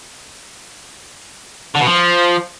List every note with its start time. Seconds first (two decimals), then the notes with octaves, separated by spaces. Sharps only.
1.75 D3
1.81 B2
1.87 F3